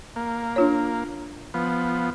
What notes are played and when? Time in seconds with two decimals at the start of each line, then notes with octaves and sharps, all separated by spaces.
0.16 A#3
0.56 D4 F4 C#5
1.54 F3 B3